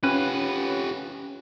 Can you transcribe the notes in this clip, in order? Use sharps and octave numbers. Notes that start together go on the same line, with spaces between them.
C#4 F4 G4 B4